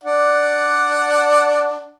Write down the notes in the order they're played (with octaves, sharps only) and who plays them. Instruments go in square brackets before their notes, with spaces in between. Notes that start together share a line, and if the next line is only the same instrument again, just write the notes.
[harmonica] D4 D5 F#5